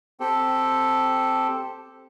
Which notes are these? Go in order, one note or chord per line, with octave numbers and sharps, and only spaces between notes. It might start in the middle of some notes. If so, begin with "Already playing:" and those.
C4 G4 A4